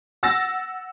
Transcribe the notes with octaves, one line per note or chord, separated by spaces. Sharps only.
F#5 E6 A6 A#6